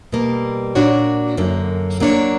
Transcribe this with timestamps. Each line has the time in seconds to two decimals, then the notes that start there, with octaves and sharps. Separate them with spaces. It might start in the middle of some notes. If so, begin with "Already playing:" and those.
0.12 B2 G3 A#3
0.75 A#2 A#3 D4 F#4 C#5
1.37 F#2 D3 A#3
2.00 F#3 A#3 D4 A#4 C#5